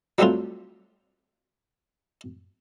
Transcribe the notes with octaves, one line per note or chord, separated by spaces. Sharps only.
F#3 G3 A3 C4 D4 F4